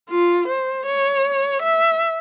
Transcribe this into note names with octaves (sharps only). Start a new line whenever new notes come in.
F4
C5
C#5
E5